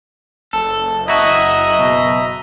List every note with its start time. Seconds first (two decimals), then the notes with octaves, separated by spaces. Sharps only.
0.53 F#1 A4
1.08 E4 F#4 D#5 E5 A#5
1.79 B2